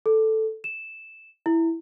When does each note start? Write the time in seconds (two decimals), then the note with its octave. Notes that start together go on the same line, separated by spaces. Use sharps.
0.06 A4
0.64 E7
1.46 E4